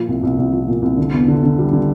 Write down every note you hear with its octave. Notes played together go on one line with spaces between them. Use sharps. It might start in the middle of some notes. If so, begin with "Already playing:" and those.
Already playing: A#2 F3
C2
C2
C2
F3
A#2
C2
D3
E2
D3
D3
G3
D3